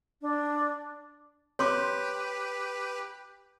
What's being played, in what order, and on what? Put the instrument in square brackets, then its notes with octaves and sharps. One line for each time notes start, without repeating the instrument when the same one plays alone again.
[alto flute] D4
[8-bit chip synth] G4 B4 [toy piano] C#5 C6 D6